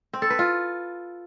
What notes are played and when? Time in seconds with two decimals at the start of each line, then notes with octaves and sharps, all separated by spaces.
0.13 C4
0.22 A4
0.30 B4
0.39 F4